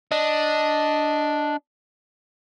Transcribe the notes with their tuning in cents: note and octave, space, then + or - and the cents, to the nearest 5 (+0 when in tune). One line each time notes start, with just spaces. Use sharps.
D4 +0 D#5 +0